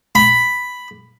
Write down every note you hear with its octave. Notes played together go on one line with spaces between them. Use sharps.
B5